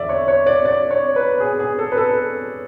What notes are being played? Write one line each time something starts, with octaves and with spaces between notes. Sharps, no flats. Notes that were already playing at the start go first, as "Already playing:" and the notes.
Already playing: E2 D3 D5 E5
C#5
C#5
D5
D5
C#5
B4
G#4
G#4
A4
B4
A4